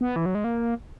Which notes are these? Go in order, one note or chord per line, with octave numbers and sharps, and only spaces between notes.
B3
E3
F#3
G#3
A#3